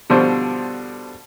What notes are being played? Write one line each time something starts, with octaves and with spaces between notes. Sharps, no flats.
B2 D3 F3 G3 C5 C#6